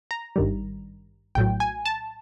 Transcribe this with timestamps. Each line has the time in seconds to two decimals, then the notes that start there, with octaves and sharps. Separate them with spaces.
0.11 A#5
0.36 G#1 G2 D#3 G3
1.35 A#1 A2 F#3 G5
1.60 G#5
1.85 A5